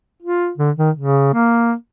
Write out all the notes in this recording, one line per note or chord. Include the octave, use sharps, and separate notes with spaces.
F4
D3
D#3
C#3
A#3